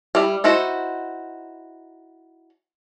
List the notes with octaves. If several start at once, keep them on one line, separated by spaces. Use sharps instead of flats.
G3 E4
D#4 E4 F#4 C5